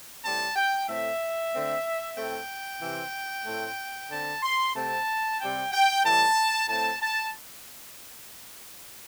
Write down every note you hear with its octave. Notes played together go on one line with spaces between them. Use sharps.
A2 G3 C4 A5
G5
A2 A3 C4 E5
D3 A3 C4
A2 A3 C4 G5
C3 E3 C4
A2 A3 C4
D3 C4 A5
C6
C3 A3 C4 A5
C3 G3 C4 G5
G5
A2 E3 G3 A5
A2 A3 C4 A5
A5